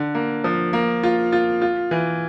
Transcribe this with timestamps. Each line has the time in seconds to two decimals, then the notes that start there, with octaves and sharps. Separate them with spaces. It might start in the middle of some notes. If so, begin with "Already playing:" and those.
Already playing: D3
0.15 A#3
0.44 F3
0.73 A#3
1.03 F4
1.32 F4
1.62 F4
1.91 E3